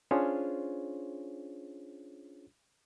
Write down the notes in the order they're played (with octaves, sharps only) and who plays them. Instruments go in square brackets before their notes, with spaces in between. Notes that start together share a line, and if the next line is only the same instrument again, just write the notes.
[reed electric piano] C#4 D4 F4 G#4 C5 C#5